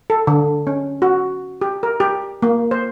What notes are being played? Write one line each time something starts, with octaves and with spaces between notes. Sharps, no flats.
A4
D3
C#4
F#4
G4
A#4
G4
A#3
C5